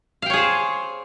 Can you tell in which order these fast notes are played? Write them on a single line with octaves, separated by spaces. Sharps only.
F5 G5 C#5 G#4 C5